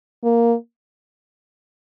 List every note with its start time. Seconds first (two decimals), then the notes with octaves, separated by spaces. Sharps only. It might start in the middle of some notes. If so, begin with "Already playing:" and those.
0.23 A#3